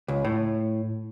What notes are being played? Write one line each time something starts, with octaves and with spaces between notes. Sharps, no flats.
C#2
A2